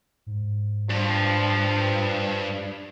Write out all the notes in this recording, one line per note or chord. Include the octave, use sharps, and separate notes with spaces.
G#2
G2 F3